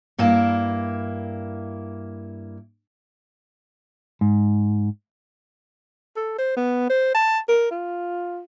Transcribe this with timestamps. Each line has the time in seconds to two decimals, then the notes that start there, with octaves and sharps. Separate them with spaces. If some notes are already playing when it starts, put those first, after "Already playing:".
0.18 G2 A#3 E4 A5
4.21 G#2
6.16 A4
6.38 C5
6.57 B3
6.90 C5
7.14 A5
7.49 A#4
7.71 F4